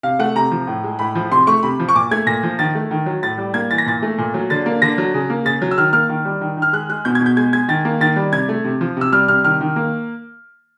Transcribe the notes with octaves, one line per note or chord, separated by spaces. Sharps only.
C3 F5
A3 F#5
C3 A#5
F3
A2
G#3
A2 B5
F3
C3 C6
A3 C#6
C3 B5
F3
C#6
A#2 D6
A3 G#6
A#2 A#6
F3
D#3 A6
A3
D#3
F#3
A2 A6
G3
A#3 G#6
E3 A6
A#6
A#2 A6
A3
A#2
F#3
D3 A6
A#3
D3 A#6
F#3
C#3
A#3
C#3 A6
F#3
E6
D#3 F6
A#3 F6
D#3
G3
D#3
D#3
F6
G#3 F#6
G#3 F#6
B2 G6
G#6
B2
G6
G#3 G#6
G#3 G#6
D#3 A6
A#3
D#3 A6
G3
C3 G#6
A3
C3
F3
C3 E6
G3 F6
C3 F6
D#3 F6
D#3
A#3